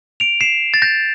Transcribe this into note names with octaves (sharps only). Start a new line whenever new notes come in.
D7 F7
C7 E7
A6
G6 A#6